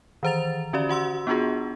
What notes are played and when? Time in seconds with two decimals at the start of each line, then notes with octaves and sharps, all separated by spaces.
0.23 D#3 E3 C5 A#5 A6 F7
0.73 D3 C#4 F#4 G4 D5
0.89 F#4 F#5 C6 E6
1.27 B3 D4 F4 F#4 G#4